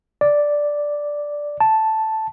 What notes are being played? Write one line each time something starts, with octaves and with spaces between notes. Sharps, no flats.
D5
A5